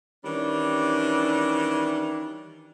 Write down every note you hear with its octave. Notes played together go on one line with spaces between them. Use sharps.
D#3 E3 G3 C#4 D4